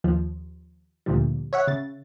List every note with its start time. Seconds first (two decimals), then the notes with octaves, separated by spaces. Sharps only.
0.04 D#2 F3
1.06 D2 A#2 D3 F3 G3
1.53 C#5 E5 F#5
1.67 C#3 A6